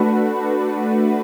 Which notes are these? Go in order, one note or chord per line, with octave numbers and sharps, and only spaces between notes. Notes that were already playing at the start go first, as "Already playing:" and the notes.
Already playing: A3 D4 F#4 B4